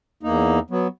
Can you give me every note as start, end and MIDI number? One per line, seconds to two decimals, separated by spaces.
0.23 0.59 40
0.23 0.59 58
0.23 0.59 63
0.70 0.87 54
0.70 0.87 59